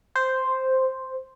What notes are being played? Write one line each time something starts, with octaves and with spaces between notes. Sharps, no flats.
C5